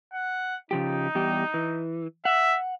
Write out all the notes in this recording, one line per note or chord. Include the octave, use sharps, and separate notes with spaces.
F#5
C#3 F3 D#4 G4
E2 G3 G4
E3
E5 F#5